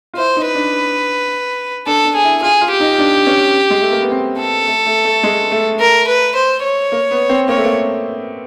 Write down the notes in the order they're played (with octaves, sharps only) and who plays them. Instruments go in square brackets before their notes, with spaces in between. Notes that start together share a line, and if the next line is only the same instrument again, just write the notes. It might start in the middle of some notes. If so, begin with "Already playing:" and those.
[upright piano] F4
[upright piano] E4 [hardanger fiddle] C5
[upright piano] D#4
[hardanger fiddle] B4
[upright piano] D4
[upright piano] D4 [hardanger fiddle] A4
[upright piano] D4
[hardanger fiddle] G#4
[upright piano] E4
[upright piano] F4 [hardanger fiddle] G#4
[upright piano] F4
[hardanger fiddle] G4
[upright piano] D#4
D4
C#4
G#3
A3
A#3
B3
C4
[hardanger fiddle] A4
[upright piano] A3
A3
A3
G#3
A3
[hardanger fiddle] A#4
B4
C5
C#5
[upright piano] A#3
B3
C4
[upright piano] A#3 [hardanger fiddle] C#5
[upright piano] A3
A#3